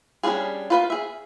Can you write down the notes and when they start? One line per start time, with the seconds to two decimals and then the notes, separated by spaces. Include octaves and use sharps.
0.23 G3 C#4 D4 F4 G#4
0.70 F4 B4 F5
0.90 G#4 E5